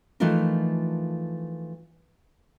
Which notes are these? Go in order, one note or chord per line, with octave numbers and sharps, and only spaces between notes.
E3 F3 A3 D#4 F4 A#4